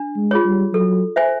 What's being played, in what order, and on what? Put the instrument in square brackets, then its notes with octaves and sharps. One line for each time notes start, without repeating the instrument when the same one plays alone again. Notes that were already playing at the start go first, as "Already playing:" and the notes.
Already playing: [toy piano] D4
[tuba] G#3
[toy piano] F4 G#4 C#5
[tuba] G3
[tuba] F#3 [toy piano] A4
[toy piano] C5 E5 G#5